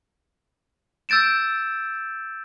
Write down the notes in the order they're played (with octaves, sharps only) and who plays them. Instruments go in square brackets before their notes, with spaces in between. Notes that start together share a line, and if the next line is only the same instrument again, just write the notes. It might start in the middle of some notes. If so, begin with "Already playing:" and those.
[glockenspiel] E6 G6 A6 D7 E7